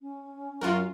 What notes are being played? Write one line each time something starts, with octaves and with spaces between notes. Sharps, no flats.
C#4
F#2 F4 F#4 A#4